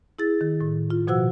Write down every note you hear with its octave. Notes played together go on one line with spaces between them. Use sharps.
E4 G#4 A6
D#3
A2
F4
B2 F3 F#4 C5 F#5 E6